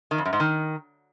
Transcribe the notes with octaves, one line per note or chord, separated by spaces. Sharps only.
D#3
F2
F#2
G#2
D#3